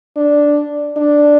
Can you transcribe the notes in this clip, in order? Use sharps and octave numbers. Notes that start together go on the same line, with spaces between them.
D4
D4